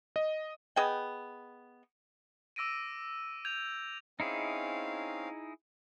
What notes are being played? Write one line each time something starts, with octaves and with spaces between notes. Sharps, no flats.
D#5
B3 G#4 D#5 G5
D6 E6 A#6 D7 D#7
G6 G#6 F7
C4 C#4 D#4 E4 G#4 F5